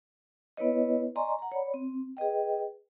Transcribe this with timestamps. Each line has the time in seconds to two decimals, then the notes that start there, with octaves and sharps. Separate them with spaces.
0.57 B3 E4 B4 C#5 D#5
1.16 D5 D#5 G#5 A#5 C6 C#6
1.39 F#5 A#5
1.52 C#5 D5 B5
1.74 C4
2.17 G#4 B4 D#5 G5